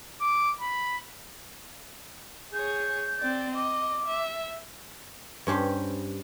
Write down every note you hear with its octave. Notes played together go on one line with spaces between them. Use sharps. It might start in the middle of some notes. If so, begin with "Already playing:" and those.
D6
B5
G#4 C#5 G6
C4 D5
D#5 D6
E5
G2 C#4 G4 C5 C6